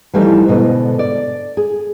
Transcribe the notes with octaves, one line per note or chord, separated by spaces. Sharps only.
E3 F3 G3 A3 D4 D#4
G#2 B2 D3 D#5
D5
G#4